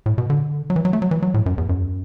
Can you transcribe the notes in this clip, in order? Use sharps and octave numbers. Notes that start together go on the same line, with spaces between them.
A2
B2
D3
F#3
E3
F#3
A3
F#3
E3
F#3
A2
F#2
E2
F#2